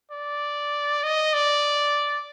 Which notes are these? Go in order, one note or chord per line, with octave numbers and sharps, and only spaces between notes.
D5
D#5
D5